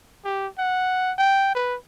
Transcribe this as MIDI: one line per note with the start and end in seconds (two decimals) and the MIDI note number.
0.25 0.47 67
0.58 1.12 78
1.18 1.54 79
1.54 1.75 71